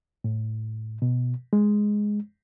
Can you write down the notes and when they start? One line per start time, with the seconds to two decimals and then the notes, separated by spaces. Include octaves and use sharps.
0.24 A2
1.02 B2
1.53 G#3